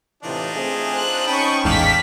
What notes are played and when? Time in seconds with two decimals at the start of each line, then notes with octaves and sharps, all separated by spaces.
0.23 A2 C3 E3 D4 D#4 F4
0.54 A3 C4 G#4
0.91 C5 F#6
1.27 C#4 D#4 G5 A5 B5 C#6 D#6
1.65 A1 E2 G#2 D5 F5 G5 A5 B6